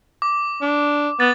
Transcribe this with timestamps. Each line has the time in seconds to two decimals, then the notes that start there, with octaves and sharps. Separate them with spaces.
0.22 D6
0.62 D4
1.20 B3 A6